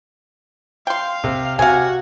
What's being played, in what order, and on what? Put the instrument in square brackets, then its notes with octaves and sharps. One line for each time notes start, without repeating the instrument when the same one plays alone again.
[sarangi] F5 [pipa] G5 C6
[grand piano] C3
[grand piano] C3 [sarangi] F#4 [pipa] F5 G#5